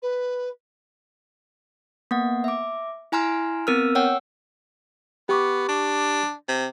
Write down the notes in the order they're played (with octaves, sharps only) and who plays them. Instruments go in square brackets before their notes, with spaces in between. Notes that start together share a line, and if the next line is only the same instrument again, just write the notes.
[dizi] B4
[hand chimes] A#3 B3 F#5
E5 D6
E4 G#5 A#5 C6 F6
B3 C4 A#4 E6 F6
C#5 F#5 G5 E6
[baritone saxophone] B3 [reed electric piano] G4 C#6 D6
[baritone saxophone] D4
C3